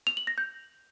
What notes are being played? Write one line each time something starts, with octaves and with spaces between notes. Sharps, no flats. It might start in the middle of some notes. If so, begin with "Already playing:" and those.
F7
F#7
A#6
G6